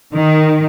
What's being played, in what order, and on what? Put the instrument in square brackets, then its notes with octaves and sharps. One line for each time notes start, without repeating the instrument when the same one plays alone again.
[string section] D#3